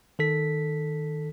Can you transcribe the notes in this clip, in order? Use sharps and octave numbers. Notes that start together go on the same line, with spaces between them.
D#3 A4 B6